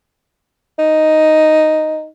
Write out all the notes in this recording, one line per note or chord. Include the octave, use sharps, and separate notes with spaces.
D#4